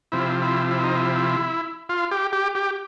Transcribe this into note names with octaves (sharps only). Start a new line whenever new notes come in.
C3 F3 E4
E4
E4
D#4
E4
F4
G4
G4
G4